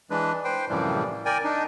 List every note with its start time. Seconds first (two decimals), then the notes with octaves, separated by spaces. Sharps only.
0.10 E3 G#3 D4 B4
0.44 B4 C5 G5
0.69 F#2 A2 C3 E3 F3 G3
1.26 A#4 D5 G5 G#5
1.44 D4 D#4